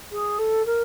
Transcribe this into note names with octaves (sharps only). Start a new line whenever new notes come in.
G#4
A4
A#4